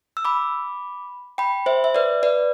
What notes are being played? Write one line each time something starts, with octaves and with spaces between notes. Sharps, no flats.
E6
B5 D6
G5 B5
C5 E5
E5
B4 D5
B4 D5